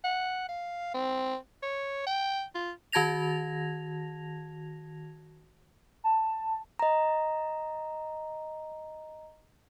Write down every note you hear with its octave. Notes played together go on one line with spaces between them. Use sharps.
F#5
F5
C4
C#5
G5
F4
D#3 F#4 A5 G#6 A#6 F7
A5
D#5 A#5